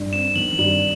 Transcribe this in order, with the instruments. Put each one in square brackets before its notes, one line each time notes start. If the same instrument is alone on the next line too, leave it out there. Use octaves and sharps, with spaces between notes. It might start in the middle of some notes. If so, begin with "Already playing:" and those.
Already playing: [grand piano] G2
[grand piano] C4 [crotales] E7
[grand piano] D#3 [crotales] F#7
[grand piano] G2 [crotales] F#7